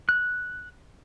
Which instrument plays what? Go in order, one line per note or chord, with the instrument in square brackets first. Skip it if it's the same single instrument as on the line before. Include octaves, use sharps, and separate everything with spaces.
[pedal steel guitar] F#6